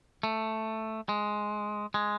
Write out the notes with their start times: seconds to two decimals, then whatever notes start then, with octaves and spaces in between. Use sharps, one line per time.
0.23 A3
1.09 G#3
1.94 G#3